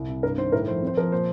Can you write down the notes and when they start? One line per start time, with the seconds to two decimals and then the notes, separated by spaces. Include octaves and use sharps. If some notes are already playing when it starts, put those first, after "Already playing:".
Already playing: C2
0.08 C3
0.23 G2 A#4
0.38 D#3 C5
0.52 A2 A#4
0.68 F3 C5
0.82 C4 C5
0.97 F3 A#4
1.12 A#2 C5